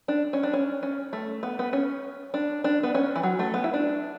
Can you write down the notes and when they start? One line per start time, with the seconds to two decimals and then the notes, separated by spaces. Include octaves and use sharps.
0.08 D4
0.33 C#4
0.43 D4
0.53 C#4
0.83 C#4
1.13 A3
1.43 B3
1.59 B3
1.73 C#4
2.34 D4
2.64 D4
2.83 B3
2.94 C#4
3.16 E3
3.23 F#3
3.39 A3
3.54 B3
3.64 E4
3.73 D4